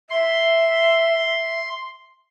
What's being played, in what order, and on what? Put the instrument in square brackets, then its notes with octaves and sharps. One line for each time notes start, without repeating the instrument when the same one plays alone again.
[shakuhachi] E5 [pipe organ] C6